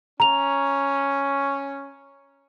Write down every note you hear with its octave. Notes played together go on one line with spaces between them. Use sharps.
C#4 A#5 F7